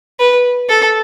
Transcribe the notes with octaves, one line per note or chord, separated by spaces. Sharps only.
B4
A4